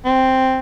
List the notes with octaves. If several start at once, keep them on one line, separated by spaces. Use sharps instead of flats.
C4